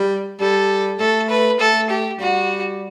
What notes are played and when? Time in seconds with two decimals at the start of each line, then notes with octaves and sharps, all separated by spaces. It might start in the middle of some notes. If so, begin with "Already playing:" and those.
Already playing: G3
0.40 G3 A4
1.00 A3 A4
1.30 B4
1.59 A3 A4
1.90 G4
2.19 G3 F#4